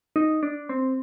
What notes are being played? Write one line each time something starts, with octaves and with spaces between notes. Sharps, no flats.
D#4
D4
C4